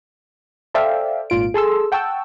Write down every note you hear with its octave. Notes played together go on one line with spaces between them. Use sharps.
A4 C5 D5 E5 F5 G5
G#1 A#2 F4 D7
G#4 A4 C6 E6
F#5 G5 A5 C#6 E6